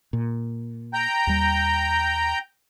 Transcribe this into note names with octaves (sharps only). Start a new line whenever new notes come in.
A#2
G5 A#5 G6
D#2 G3